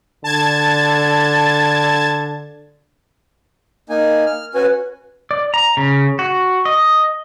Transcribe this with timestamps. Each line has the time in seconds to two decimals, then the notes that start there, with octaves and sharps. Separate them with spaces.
0.24 D3 A5 G#6 A6
3.89 A#3 D#4 G#5
4.26 F6
4.55 C#4 F#4 B4 G#5
5.31 D5
5.54 A#5
5.77 C#3
6.19 F#4
6.65 D#5